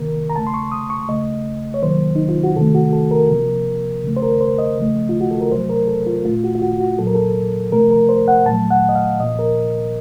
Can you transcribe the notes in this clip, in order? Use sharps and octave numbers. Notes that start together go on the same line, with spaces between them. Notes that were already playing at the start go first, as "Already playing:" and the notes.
Already playing: C3 D#3 A#3 A#4
A#5
C#3 A3 A5
C6
C#6
D#6
C#6
C#3 A3 D#5
C#5
C3 D#3 F#3 A#3 C5
D#4
F4
F#4
C3 D#3 A3 A4
F#4
A4
A#4
C3 F3 A#3
C#3 A3
C5
A#4
C5
D#5
C#3 F3 A3
F4
F#4
A4
A#4
C3 F#3 A3 C5
A#4
A4
F4
A#2 A3 F4
F#4
F4
F#4
F#4
A#2 F#3 A#3 A4
A#4
A4
C3 F3 A3 A#4
A#4
C5
F#5
A#2 F#3 A3 A5
F#5
D#5
F5
A#2 F3 A#3 D#5
A#4